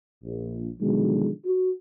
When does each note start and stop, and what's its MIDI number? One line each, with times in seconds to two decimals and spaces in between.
0.24 0.66 34
0.80 1.29 47
0.80 1.29 50
0.80 1.29 51
0.80 1.29 53
0.80 1.29 54
0.80 1.29 56
1.45 1.69 66